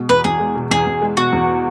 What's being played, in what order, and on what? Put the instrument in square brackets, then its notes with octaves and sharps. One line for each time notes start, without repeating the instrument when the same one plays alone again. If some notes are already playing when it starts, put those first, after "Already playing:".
Already playing: [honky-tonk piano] B2 G#3
[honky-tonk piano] E2 [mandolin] B4
[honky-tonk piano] E2 [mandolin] G#4
[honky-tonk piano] G#3
B2
[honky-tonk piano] E2 [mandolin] G#4
[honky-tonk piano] E2
G#3
[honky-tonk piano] B2 [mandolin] F#4
[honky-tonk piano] E2